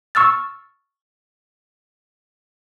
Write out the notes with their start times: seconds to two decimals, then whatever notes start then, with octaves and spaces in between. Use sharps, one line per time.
0.15 C#6 E6 F6 A6